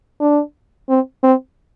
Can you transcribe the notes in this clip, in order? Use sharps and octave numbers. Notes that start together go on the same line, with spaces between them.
D4
C4
C4